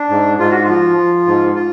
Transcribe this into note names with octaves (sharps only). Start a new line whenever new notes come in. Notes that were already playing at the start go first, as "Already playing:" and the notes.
Already playing: D4
G#2
G#2 F4
F#4
F3 F4
F3
G#2
F4